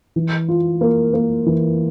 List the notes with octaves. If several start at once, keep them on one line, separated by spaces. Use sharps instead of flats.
E3
F4
A#3
A#3
E3